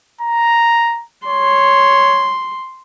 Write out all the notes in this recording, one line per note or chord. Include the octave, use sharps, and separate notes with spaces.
A#5
C#5 C6